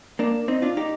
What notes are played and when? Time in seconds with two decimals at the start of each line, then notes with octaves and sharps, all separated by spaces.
0.19 A#3 D4
0.48 C4 D#4
0.62 D4 F4
0.77 D#4 G4